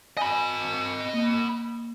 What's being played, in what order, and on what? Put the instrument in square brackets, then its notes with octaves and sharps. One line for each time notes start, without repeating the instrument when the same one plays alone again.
[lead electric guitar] D#5 B5 [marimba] G#5
[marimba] A#3